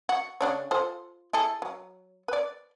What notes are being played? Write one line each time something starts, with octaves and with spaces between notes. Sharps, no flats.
F#4
C#3 D4 C#5
F4 A4 C5
E4 G#4 A4
F#3
B4 D5